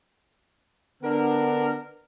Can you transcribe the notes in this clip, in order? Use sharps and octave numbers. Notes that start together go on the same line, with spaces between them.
D3 B3 D4 A#4